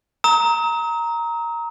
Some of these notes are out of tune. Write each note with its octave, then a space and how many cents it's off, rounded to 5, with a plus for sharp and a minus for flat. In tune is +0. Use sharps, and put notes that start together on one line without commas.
A#5 +0 D#6 +45